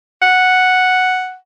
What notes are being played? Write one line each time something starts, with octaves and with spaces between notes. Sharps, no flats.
F#5